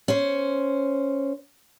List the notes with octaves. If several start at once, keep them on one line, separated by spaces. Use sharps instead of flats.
C#4 C5